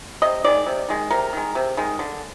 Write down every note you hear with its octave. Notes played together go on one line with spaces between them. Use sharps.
C3 D#5
D#3 G#3 D5
C3
D#3 G#3
C3 A#4
D#3 G#3
C3
D#3 G#3
D3